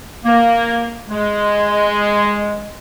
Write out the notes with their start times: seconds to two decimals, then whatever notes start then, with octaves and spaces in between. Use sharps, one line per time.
0.24 A#3
1.09 G#3